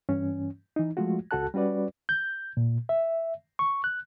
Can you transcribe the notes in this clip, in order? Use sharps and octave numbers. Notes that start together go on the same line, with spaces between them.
G2 E3 C#4
E3 D#4
F3 G#3 A3 F4 F#4
C#2 F#4 A4 A5 F#6
G3 C#4 F#4 B4 D5
G6
A#2
E5
C#6
F#6